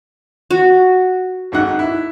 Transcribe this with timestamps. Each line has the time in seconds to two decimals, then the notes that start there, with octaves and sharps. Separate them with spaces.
0.51 F#4
1.52 G#1 G#2 F#5
1.79 E4